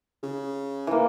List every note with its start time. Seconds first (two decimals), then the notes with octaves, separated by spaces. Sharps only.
0.23 C#3
0.87 E3 A#3